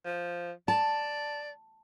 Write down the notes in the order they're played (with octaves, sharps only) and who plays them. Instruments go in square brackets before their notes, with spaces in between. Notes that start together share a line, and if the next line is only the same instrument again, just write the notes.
[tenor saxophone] F3
[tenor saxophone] D5 [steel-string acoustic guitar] A5